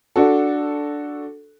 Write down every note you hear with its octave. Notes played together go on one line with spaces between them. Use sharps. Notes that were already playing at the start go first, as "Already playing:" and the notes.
D4 F#4 A4